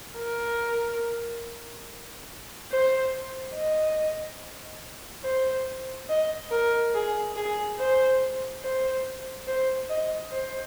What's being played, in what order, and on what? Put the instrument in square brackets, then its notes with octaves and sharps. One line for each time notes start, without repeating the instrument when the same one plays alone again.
[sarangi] A#4
C5
D#5
C5
D#5
A#4
G#4
G#4
C5
C5
C5
D#5
C5